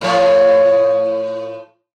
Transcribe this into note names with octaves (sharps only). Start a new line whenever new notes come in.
A2 F3 C#5